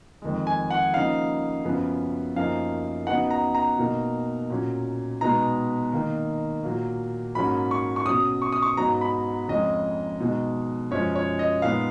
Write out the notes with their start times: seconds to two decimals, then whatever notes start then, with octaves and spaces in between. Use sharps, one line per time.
0.22 F2 D#3 G#3
0.47 G#5
0.71 F#5
0.94 C#3 F3 A#3 D#4 F5
1.65 F#2 C#3 F3 B3
2.36 F#2 F3 A#3 D#4 F5
3.07 C#3 F#3 B3 D#4 F#5
3.31 A#5
3.55 A#5
3.79 B2 A#3 D#4
4.50 A#2 F#3 C#4
5.21 B2 G#3 B3 D#4 A#5
5.92 D#3 A#3 D#4
6.64 A#2 F#3 A#3
7.35 G#2 F#3 A#3 C#4 B5
7.71 C#6
7.96 C#6
8.06 B2 F#3 C#4 D#6
8.42 C#6
8.52 D#6
8.62 C#6
8.77 G#2 F#3 B3 D#4 A#5
9.01 B5
9.48 F2 C#3 G#3 C#4 D#5
10.20 B2 G#3 D#4
10.91 F#2 F3 G#3 C#4 C#5
11.15 C#5
11.39 D#5
11.62 A#2 G#3 B3 D#4 F5